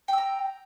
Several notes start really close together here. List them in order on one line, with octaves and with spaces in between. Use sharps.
G5 E6 A#5